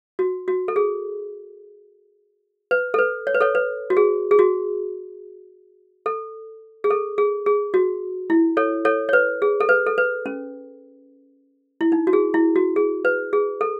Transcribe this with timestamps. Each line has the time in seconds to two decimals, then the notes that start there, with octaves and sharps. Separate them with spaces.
0.19 F#4
0.48 F#4
0.68 A4
0.76 G#4
2.71 B4
2.94 A4
2.99 B4
3.27 C#5
3.35 B4
3.41 A4 C#5
3.55 B4
3.90 F#4
3.97 G#4
4.31 G#4
4.39 F#4
6.06 A4
6.84 G#4
6.90 A4
7.18 G#4
7.46 G#4
7.74 F#4
8.30 E4
8.57 A4 C#5
8.85 A4 C#5
9.09 C#5
9.13 B4
9.42 G#4
9.60 A4
9.69 B4
9.86 A4
9.98 B4
10.26 C#4
11.81 E4
11.92 D#4
12.07 F#4
12.13 G#4
12.34 E4
12.56 F#4
12.76 G#4
13.05 B4
13.33 G#4
13.61 A4